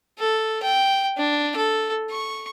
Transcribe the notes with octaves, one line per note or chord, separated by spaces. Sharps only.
A4
G5
D4
A4
C#6